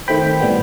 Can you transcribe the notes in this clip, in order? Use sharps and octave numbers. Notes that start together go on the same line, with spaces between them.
D#3 A3 C4 G5 B5
A2 G3 B3